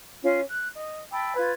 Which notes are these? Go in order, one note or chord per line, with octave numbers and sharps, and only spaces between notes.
C#4 F4
F#6
D#5
G5 A5 B5 E6
F4 B4 G#6